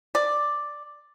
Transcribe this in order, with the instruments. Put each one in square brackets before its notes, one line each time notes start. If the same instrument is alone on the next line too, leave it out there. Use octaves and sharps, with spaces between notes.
[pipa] D5